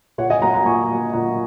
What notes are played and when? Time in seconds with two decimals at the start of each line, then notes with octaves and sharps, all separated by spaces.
0.18 A#2 C#5 F#5
0.30 D#5 G#5
0.42 F#3 A#3 F#5 A#5
0.54 F#5 A#5
0.66 A#2 G#5 C#6
0.90 F#3 A#3
1.13 A#2 F#5 A#5